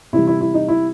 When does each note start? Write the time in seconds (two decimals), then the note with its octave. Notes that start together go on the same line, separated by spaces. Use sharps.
0.13 C3 E3 G3 E4
0.27 E4
0.41 E4
0.54 D#4
0.68 E4